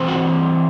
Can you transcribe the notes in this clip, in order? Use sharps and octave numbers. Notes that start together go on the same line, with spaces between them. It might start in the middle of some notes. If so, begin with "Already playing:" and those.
Already playing: E3 G3 C4
F#4